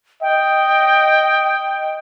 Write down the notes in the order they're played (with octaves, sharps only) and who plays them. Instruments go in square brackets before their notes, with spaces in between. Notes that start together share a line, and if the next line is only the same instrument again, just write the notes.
[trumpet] D#5 [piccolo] G5